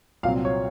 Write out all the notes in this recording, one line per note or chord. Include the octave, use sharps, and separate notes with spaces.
C2 A#2 F#3 C4 F5
C#5